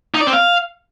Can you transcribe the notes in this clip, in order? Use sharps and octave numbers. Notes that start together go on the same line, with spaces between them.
D#4
D5
C4
F5